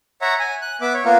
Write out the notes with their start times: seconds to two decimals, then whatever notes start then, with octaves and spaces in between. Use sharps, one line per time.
0.22 C#5 E5 F#5 A#5
0.40 G#5
0.62 F#6
0.81 B3 E5 D6
0.94 C#5
1.05 A#3 B3 F4 A#4